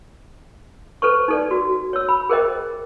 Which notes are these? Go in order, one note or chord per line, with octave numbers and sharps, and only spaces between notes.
A4 B4 C5 C#6
D#4 A4 D5
F#4
C#5 E6
B5
G#4 A#4 C5 D#5 G5